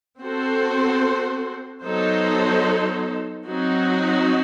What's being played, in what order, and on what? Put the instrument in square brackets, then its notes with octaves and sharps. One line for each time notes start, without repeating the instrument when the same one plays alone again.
[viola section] C4 F#4 A4 C5
F#3 B3 D#4 A4 C5
F#3 C4 D#4 F#4